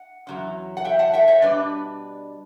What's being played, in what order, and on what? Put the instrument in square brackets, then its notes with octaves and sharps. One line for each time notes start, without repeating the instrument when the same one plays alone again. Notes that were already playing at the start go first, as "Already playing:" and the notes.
Already playing: [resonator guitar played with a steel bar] F#5
E2 B2 F#3 C#4
F#5
E5 G5
F#5 A5
E5 G5
C#5 E5
B2 G3 D4 B4 D5